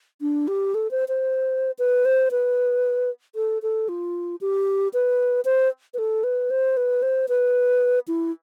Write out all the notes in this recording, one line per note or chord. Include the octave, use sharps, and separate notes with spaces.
D4
G4
A4
C5
C5
B4
C5
B4
A4
A4
F4
G4
B4
C5
B4
A4
B4
C5
B4
C5
B4
E4